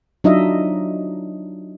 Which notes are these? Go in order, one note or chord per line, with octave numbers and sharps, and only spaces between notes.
F#3 D4 D#4 F4 D#5 E5